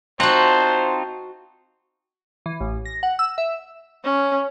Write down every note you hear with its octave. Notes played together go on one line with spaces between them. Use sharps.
C4 D#4 F4 F#4 C5 F#5 A5
E3
A1
A#6
F#5
E6
E5
C#4